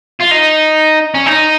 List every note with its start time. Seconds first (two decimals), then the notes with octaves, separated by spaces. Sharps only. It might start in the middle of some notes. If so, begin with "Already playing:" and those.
0.20 F4
0.31 D#4
1.15 C#4
1.26 D#4